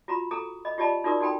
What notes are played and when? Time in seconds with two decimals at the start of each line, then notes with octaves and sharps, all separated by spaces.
0.08 F4 F#4 A#5 B5
0.31 G#4 A4 A#5 D#6
0.65 D#5 B5
0.78 F4 G4 D5 D#5 A5 B5
1.04 D#4 F4 F#4 A#4 D5 D#6
1.20 D#4 F#4 A4 G5 B5